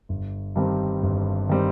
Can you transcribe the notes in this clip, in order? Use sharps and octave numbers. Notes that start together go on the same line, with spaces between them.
G1
G2 D#3 G3 C4
G1
D#3 G3 C4